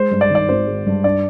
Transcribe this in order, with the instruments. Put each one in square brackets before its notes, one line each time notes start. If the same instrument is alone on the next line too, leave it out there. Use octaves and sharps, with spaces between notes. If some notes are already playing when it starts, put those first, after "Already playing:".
Already playing: [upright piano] G#3 [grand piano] C5
[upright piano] G2
[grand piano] D5
[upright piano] D#3
[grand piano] D5
[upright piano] G#1 [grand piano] C5
[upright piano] G#3
G2
[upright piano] D4 [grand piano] D5